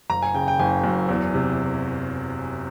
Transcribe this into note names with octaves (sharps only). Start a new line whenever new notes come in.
F#1 A#5
G#5
C#3 G5
G5
F#1 G#5
F#2
E2
C3